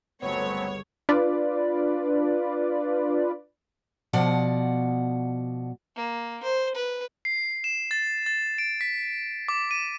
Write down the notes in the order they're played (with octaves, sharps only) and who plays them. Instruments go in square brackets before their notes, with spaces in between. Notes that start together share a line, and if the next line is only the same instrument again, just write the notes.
[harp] G1 C#2 [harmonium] F#3 A3 C4 [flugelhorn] B3 [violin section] C#5
[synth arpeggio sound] D4 F4 B4 D5
[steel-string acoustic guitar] B2 F3 D5 F#5
[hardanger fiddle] A#3
C5
B4
[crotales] C7
E7
A6
A6
D7
B6
D6
D#7